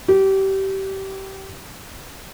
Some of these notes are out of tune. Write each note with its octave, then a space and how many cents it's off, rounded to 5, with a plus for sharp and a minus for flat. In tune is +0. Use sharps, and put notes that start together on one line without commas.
G4 -25